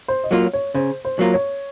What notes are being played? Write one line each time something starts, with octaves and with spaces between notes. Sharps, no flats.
C5
D#5
F#3 A#3 F4 C#5
C#5
C#3 C5
C5
F#3 A#3 F4
C#5